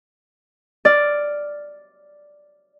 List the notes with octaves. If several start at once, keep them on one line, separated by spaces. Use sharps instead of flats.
D5 F6